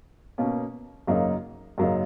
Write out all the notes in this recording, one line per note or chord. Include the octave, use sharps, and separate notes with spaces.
B2 A#3 C#4
F#2 C#3 F#3 A#3 D#4
F#2 C#3 F#3 A#3 D#4